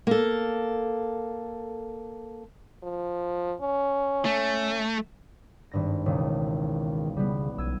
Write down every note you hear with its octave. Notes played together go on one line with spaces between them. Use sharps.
A#3 A4
F3
C#4
A3
G#1 G2 A#6
E1 C#2 D#3
C#3 G3 B3
B1 E6 G#6 D#7